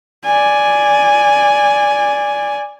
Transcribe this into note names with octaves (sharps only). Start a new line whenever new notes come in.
D5 G#5